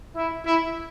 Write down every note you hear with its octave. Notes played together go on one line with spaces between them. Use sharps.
E4
E4